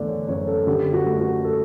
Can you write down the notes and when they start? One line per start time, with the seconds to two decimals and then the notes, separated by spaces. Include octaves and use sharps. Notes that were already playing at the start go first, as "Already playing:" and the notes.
Already playing: E2 D3 A3 D5
0.08 C#5
0.28 F#1 C#5
0.48 A4
0.67 D3 G4
0.93 F#4
1.06 A3
1.19 F#4
1.45 A4